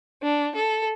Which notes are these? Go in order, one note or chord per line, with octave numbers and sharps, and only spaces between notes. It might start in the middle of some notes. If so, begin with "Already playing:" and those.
D4
A4